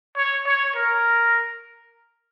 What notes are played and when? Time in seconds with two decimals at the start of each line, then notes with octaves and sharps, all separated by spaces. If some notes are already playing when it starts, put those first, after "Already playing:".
0.17 C#5
0.47 C#5
0.76 A#4